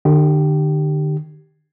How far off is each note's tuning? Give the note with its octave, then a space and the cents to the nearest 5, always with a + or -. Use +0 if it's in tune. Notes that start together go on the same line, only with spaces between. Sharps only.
D3 +40 G4 -10